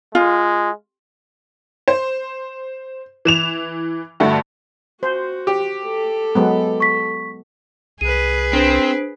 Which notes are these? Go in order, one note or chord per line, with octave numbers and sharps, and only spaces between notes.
G#3 F4
C5
E3 E7 F7
G2 D3 A3 F#4
F#4 C5
G4
A4
F#3 G#3 B3
C#6 B6
C2 G#4 B4 D#7
C4 D4 C5 D7